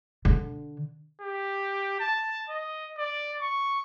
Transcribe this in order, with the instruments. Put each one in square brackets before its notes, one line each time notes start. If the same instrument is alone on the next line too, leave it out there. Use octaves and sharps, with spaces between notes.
[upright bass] D3 D4
[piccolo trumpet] G4
A5
D#5
D5
C#6